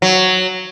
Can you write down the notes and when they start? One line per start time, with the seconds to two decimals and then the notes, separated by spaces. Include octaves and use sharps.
0.02 F#3